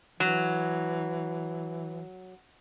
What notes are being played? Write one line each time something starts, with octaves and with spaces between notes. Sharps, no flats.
E3 F#3